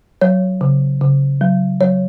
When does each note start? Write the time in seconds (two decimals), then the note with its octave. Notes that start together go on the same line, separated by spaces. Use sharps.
0.21 F#3 C#5
0.61 C#3
1.01 C#3
1.41 F#3
1.81 F#3 C#5